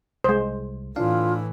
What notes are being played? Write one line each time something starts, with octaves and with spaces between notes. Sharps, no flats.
C2 G#3 C5
A2 E3 D4 F4 F5